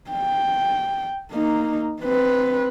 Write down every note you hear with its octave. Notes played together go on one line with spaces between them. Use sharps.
G5
A#3 D#4
C4 B4